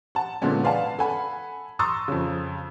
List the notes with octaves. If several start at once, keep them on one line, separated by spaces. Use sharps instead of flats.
F#5 A5
A#2 D3 G#3 B3 C#4
B4 D5 F5 F#5 G#5 A5
A4 F#5 G#5 B5
A#5 C6 C#6 D#6 E6 A6
F2 C#3